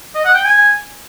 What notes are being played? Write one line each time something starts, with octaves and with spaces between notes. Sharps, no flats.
D#5
F#5
G5
G#5